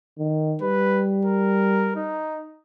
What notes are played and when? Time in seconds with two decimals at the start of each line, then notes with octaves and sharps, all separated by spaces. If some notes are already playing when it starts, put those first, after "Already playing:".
0.18 D#3
0.62 G3 B4
1.25 A#4
1.96 D#4